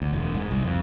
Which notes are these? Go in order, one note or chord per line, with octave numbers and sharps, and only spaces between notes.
D2
E1
G#2
C2
F2